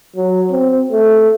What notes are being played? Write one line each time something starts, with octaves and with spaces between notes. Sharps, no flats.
F#3
C4
A3